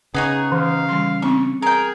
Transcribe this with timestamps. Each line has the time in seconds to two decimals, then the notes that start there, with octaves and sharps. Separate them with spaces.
0.14 C#3 B3 D#4 G#4 C#5
0.52 E3 F5
0.89 E3 G3 C6
1.22 B3 C4 D#4 C#6
1.62 G#4 A#4 G5